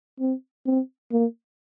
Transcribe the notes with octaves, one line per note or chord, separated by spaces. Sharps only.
C4
C4
A#3